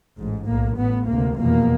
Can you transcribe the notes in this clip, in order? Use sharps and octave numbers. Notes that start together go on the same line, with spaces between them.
A1 G#2
B1 A2 A#3
A1 A2 B3
D2 C3 A#3
F1 E2 B2 A#3